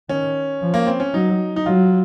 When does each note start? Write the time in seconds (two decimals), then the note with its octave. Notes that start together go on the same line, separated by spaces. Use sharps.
0.09 D#3 C#4
0.61 F3
0.74 A#3
0.87 C4
1.00 C#4
1.14 F#3 D#4
1.56 D#4
1.66 F#3 F4